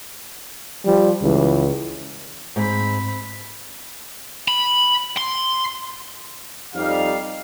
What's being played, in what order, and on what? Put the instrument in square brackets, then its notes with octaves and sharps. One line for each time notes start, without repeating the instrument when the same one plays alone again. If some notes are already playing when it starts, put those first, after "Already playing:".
[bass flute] F3 [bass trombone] G3
[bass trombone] C#2 [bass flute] E3
[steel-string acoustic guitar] G#2 [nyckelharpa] C4 B5
[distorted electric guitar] B5
C6
[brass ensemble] F2 G3 D#4 F5